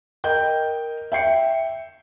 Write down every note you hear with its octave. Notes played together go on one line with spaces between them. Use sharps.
A#4 D#5 G5 G6
E5 G5 C7 C#7